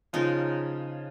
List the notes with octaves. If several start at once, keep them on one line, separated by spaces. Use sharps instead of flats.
C#3 F3 G#3 D#4 F4 A#4